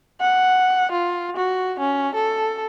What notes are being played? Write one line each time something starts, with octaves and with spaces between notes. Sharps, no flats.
F#5
F4
F#4
C#4
A4